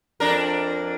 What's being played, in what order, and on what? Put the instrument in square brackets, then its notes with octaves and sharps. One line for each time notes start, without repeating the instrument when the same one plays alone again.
[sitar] F2 D4 A#4